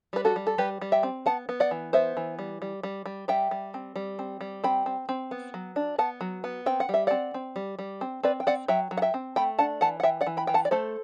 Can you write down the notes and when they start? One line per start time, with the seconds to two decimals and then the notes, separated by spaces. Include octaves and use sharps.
0.13 G3 B4
0.25 F#4 A4
0.36 G3
0.47 A4
0.58 G3 G4 B4
0.81 G3
0.92 E5 G5
1.03 C4
1.26 B3 F#5 A5
1.49 B3
1.60 D5 F#5
1.71 E3
1.93 B3 C5 E5
2.17 E3
2.39 G3
2.62 G3
2.83 G3
3.06 G3
3.28 G3 E5 G5
3.51 G3
3.74 C4
3.96 G3
4.19 C4
4.41 G3
4.64 C4 G5 B5
4.86 C4
5.09 C4
5.31 B3
5.54 F#3
5.76 D4
5.98 B3 F#5 A5
6.21 F#3
6.44 B3
6.66 C4 G5
6.80 F#5
6.89 G3 E5
7.07 C4 D5 F#5
7.34 C4
7.56 G3
7.79 G3
8.01 C4
8.23 C4 B4 D5
8.40 G5
8.47 C4 D5 F#5
8.68 F#3 E5 G5
8.91 F#3
8.98 F#5
9.02 E5 G5
9.14 C4
9.36 A3 G5 B5
9.59 D4 F#5 A5
9.81 E3 F#5 A5
10.00 F#5
10.03 E3 E5 G5
10.21 D5 F#5
10.27 E3
10.37 G5 B5
10.47 E3 G5
10.54 F#5 A5
10.65 D5
10.71 A3 A4 C5